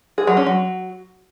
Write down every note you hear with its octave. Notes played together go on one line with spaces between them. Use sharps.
G#4
F#3
C#4
F#3